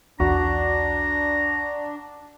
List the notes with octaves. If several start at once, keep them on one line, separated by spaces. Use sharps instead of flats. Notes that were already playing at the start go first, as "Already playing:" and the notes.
B1 E2 D4 F#4 A#5